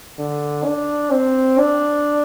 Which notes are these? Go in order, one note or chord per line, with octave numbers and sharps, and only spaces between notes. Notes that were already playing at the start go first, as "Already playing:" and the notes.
D3
D4
C4
D4